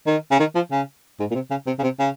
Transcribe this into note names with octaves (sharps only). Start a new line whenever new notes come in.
D#3
C#3
D#3
F3
C#3
G#2
A#2
C3
C#3
C3
C#3
C3
C#3